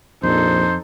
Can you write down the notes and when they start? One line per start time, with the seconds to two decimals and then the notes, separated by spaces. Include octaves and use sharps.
0.23 A#1 F2 D#4 A4 C5